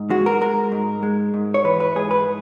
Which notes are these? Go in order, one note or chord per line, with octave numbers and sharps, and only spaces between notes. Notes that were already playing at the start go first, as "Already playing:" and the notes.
Already playing: G#2
G#3 F#4
A#4
G#3 A#4
G#2
G#3
G#2
C#5
E3 B4
B4
G#2 G#4
B4